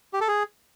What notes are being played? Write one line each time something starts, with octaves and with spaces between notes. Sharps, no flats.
G4
A4
G#4